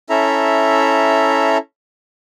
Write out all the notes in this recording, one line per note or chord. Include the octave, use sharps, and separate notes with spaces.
C#4 E4 A4 E5 A#5